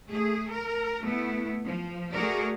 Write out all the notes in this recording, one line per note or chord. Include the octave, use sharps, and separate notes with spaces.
A3 G#4
A#4
A3 B3 E4
F3
A3 F#4 G#4 A#4 D5